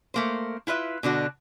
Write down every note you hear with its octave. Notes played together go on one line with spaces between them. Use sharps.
A3 A#3 C5
E4 F4 B4 E5
B2 D3 D4 F#4